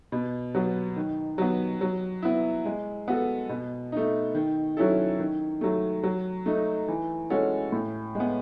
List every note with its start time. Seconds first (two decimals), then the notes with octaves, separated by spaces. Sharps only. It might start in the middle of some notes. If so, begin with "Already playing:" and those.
0.12 B2
0.55 F#3 B3
0.96 D#3
1.38 F#3 B3
1.81 F#3
2.22 B3 E4
2.65 G#3
3.08 B3 F#4 A4
3.49 B2
3.92 A3 D#4
4.35 D#3
4.77 F#3 C#4 E4 A4
5.19 D#3
5.61 F#3 A3
6.03 F#3
6.46 A3 D#4
6.88 E3
7.30 G#3 C#4 F#4 A4
7.72 A2
8.15 G#3 B3